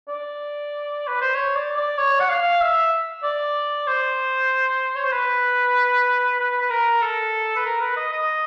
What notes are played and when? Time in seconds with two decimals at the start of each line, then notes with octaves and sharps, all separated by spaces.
0.08 D5
1.08 B4
1.21 C5
1.34 C#5
1.56 D5
1.77 D5
1.98 C#5
2.20 F#5
2.29 F5
2.61 E5
3.23 D5
3.87 C5
4.95 C#5
5.04 C5
5.12 B4
6.40 B4
6.61 B4
6.70 A#4
7.02 A4
7.56 B4
7.66 A#4
7.81 B4
7.96 D#5
8.12 D#5